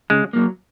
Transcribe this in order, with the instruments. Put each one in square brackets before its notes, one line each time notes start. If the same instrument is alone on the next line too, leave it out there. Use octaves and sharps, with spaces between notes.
[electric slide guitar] C#3 [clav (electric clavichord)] G#3
[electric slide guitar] F#3 A#3